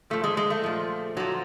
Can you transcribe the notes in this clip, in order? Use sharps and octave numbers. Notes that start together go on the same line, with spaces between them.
A#2 F3 A3
G#3
G#3
A3
A#2 F3
A#2 F3 F#3